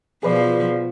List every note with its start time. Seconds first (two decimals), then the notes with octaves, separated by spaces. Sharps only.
0.23 B2 F3 G#4 B4 D5